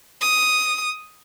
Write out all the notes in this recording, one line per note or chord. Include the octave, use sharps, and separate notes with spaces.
D#6